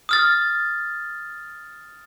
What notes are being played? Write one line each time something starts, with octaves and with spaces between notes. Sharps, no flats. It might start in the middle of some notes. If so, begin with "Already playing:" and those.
D#6 F6 A6